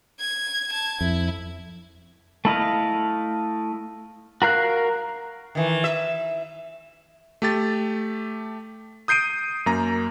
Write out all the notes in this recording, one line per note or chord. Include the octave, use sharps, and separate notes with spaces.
G#6
A5 G#6
F2 E4
A3 E4 D#5 F5
F#4 A#4 F5 F#6
D#3 E3
E5
A3 G4 A6
D#6 G6 C7 D7 D#7
F#2 A#3 A#5